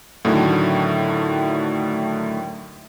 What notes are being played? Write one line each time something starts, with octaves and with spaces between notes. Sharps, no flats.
A2 D3 D#3 F#3 A3